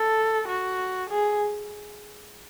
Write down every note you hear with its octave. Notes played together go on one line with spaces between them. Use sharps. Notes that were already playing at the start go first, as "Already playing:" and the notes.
Already playing: A4
F#4
G#4